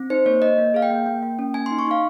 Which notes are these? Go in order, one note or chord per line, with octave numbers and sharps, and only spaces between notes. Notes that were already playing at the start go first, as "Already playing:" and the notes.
Already playing: C4
D#4 C5
A#3 C#5
A#3 D#5
A#3
G#4 F5
G5
A#3
A#3
A#3
C#4
A#3 G#5
D#4 C6
C#6
D#4 F5